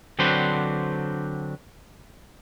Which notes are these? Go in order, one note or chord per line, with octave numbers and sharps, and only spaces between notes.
D3 F#3 C4 D4 B4 C5